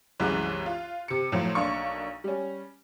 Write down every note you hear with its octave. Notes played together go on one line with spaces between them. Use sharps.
C2 F#2 E3 G#3 E4 F#6
F4
C3 C#7
A2 F3 F#3
B1 A#3 D4 C#6
G3 C#4